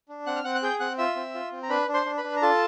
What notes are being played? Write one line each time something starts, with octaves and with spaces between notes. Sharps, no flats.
D4
C4 F#5 F#6
F6
C4 F#5 F#6
F#6
G#4 G5 G6
C4 F#5 F#6
F4 E5 E6
C4
F4
C4
A#5
D4 B4 B5
D4
C5 C6
D4
B4 B5
D4
A#5
F4 A4 A5